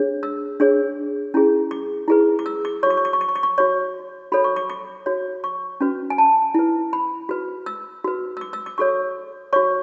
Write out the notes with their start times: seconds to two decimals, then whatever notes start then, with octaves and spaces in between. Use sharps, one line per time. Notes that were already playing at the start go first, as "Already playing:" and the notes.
Already playing: D4 G#4 C#5
0.23 E6
0.60 D4 G#4 C#5
1.34 C#4 E4 G#4
1.71 D6
2.08 E4 G#4 B4
2.39 D6
2.46 E6
2.65 D6
2.83 C#5 C#6
2.86 F#4 D6
2.97 C#6
3.05 D6
3.13 C#6
3.21 D6
3.29 C#6
3.36 D6
3.43 C#6
3.58 F#4 C#5 C#6
4.32 F#4 A4 C#5 B5
4.44 C#6
4.56 D6
4.70 D6
5.06 F#4 C#5
5.44 C#6
5.81 C#4 F#4 B4
6.10 G#5
6.18 A5
6.54 E4 B4
6.93 B5
7.29 F#4 B4
7.66 E6
8.04 F#4 B4
8.37 E6
8.41 D6
8.53 E6
8.66 D6
8.78 F#4 A4 C#5 C#6
9.53 F#4 C#5 C#6